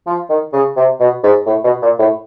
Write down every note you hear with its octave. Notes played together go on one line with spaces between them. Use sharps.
F3
D#3
C#3
C3
B2
G#2
A2
B2
A#2
A2